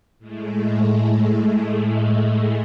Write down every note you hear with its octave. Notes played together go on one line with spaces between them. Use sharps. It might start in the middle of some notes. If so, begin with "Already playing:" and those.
A2 G#3 A3